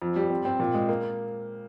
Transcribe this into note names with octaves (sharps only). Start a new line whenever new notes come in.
F2
G3
C4
C4
A#2
G#3
A#3